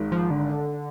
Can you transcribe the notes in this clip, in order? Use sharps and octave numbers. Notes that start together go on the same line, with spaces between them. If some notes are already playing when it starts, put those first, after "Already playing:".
Already playing: G#1 G#2 D#3 G#3
F3
D3